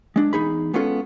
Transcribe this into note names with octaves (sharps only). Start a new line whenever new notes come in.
G#3 D4
E2 D#4 G#4 B5
G#3 B3 C#4 F4 A4